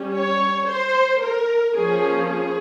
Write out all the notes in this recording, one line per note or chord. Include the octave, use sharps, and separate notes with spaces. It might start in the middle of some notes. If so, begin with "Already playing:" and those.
Already playing: G3 C#4
C#5
C5
A#4
F3 A#3 C#4 G#4
G#4